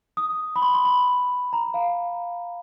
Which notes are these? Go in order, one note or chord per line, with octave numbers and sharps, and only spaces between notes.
D#6
B5
C6
C6
B5
A#5
F5